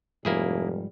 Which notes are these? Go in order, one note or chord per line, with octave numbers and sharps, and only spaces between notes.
F1 G#2 F3 G3 A#3 E4 G#4